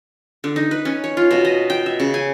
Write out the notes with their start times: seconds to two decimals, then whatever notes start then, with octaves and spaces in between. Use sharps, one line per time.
0.44 D3
0.56 D#4
0.71 B4
0.85 C#4
1.04 C#5
1.17 F4
1.31 B2
1.45 D#5
1.70 G5
1.86 E5
2.00 C#3
2.14 G#5